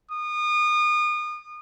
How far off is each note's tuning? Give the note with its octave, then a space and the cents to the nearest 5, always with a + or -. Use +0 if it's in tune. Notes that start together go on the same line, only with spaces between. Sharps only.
D#6 -35